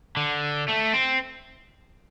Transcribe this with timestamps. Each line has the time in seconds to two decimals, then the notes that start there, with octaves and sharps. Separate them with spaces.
0.17 D3
0.69 A3
0.94 C4